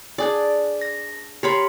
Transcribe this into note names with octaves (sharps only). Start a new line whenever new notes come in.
D4 G#4 D5
A#6
G4 A#4 C#5 B5 C6